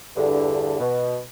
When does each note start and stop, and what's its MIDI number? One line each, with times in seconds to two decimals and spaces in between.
0.16 0.76 40
0.16 0.76 43
0.16 0.76 50
0.80 1.19 47